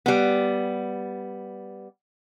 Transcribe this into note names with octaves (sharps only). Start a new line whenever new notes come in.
G3 B3